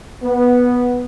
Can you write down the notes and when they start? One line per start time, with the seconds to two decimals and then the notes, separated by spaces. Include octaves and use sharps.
0.23 B3